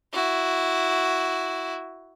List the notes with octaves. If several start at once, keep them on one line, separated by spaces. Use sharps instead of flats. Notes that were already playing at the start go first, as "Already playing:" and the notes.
E4 F#4